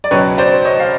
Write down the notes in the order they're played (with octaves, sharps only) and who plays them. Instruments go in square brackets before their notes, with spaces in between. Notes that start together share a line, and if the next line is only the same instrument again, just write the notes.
[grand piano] D5
C#2 B2 F#3 B4 C#5
C5 D5
C#5 D#5
F5